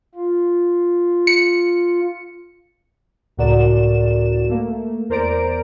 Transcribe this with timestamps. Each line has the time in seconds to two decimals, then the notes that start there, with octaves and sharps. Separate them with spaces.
0.15 F4
1.27 C#7
3.37 C#2 A2 F#4 A#4 D5 E7
4.49 A3 A#3
5.09 E2 A#4 C5 D5 A#5 D7